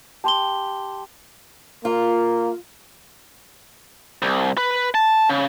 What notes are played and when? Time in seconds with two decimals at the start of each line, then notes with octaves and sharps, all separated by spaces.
0.24 G4 A5 C6 G7
1.85 A#3 F4
4.22 C2
4.57 B4
4.94 A5
5.29 C#3